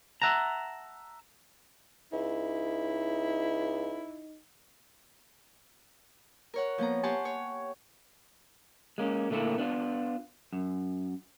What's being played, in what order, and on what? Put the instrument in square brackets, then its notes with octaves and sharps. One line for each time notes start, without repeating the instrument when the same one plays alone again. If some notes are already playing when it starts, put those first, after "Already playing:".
[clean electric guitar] E5 F#5 A5 A#5
[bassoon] C#2 [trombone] D#4 [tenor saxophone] E4
[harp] A#4 C#5 F#5
F3 A#3 B3 A#5
G4 F#5 G#5 A5 C6 C#6
C#5
[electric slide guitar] G#3 A#3 C#4
A#2 D3 A3 A#3 E4
B3 D4 F4
F#2